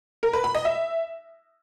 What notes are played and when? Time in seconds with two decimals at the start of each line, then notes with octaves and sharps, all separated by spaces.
0.23 A#4
0.33 B4
0.44 B5
0.55 D#5
0.65 E5